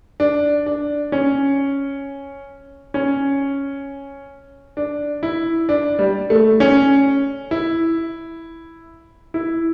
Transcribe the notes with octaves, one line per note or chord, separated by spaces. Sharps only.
D4
D4
C#4
C#4
D4
E4
D4
G3
A3
C#4
E4
E4